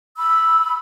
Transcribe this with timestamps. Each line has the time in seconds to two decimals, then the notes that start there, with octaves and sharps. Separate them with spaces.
0.16 B5 E6